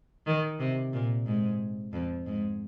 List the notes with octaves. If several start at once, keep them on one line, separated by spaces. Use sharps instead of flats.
D#3
C3
A#2
G#2
F2
G#2